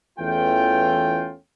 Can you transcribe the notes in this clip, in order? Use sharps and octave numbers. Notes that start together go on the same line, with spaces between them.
E2 E3 A3 C#4 F4 G5